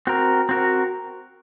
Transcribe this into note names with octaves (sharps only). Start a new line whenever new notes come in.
C4 F#4 A#4
C4 F#4 A#4